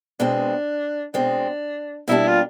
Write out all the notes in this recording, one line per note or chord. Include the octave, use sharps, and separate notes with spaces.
B2 G#3 C4 D4
B2 G#3 C4 D4
B2 G3 A#3 D4 E4 G4
F4